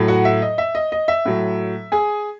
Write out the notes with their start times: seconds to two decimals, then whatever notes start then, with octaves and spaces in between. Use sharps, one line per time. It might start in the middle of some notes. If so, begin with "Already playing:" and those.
Already playing: A2 F#3
0.08 F#4 F#5
0.25 E5
0.42 D#5
0.58 E5
0.75 D#5
0.92 D#5
1.08 E5
1.25 A2 F#3
1.92 G#4 G#5